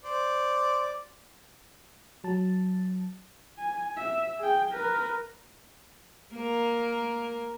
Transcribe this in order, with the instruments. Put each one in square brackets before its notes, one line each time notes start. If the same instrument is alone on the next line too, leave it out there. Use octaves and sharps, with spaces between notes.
[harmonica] C5 D5
[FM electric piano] F#3 A5
[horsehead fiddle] G#5
E5
G#4 G5
A#4 B4
[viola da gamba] A#3 A#4